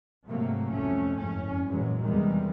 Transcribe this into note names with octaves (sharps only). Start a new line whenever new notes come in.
G#2 C3 F#3 A3 A#3
C2 F2 C3 A3 C#4
F#1 F2 G#2 C#4
A#2 E3 F#3 G#3
E2 C3 D#3 E3 G3 G#3